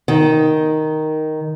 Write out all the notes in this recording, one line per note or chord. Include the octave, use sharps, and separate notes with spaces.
D#3